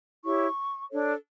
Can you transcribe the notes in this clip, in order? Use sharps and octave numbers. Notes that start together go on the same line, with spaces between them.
E4 G4 C#5 C#6
D4 A4 C#5